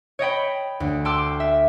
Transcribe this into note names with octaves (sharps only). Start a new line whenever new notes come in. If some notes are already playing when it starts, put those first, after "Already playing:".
C#5 D#5 G5 B5
D2
G5 A5 C6 D6 E6 F6
E5